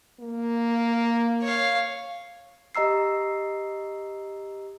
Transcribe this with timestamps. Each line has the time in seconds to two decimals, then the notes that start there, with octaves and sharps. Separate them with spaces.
0.20 A#3
1.42 C#5 F5
2.75 G4 D#5 A#5 E6 C7